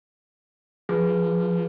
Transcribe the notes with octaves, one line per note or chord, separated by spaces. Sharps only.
F3 G#4 B4